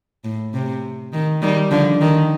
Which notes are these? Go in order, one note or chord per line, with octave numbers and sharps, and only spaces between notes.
A2
C3
D#3
D#3 G3
D3 F3
D#3